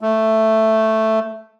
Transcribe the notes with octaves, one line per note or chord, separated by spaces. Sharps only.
A3